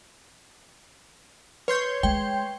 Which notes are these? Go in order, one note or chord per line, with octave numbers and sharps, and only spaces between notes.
B4 C#5 C6 G6
G#3 G5